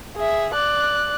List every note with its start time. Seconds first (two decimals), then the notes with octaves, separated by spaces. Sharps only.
0.16 G#4 E5
0.53 D5 F#6